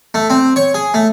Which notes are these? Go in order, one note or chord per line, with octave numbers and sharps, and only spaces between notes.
A3
C4
C#5
G#4
A3